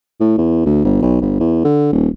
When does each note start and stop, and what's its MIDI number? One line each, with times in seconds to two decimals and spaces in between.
0.20 0.37 45
0.38 0.62 40
0.66 0.83 38
0.85 1.02 31
1.02 1.17 35
1.21 1.38 31
1.40 1.60 40
1.64 1.88 50
1.92 2.08 27